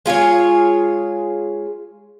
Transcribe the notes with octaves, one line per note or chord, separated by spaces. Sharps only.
G#3 F4 G#4 C#5